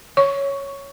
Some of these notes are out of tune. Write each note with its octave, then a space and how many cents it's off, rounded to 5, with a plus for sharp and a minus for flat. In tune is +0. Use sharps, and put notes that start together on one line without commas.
C#5 +0 C#6 +10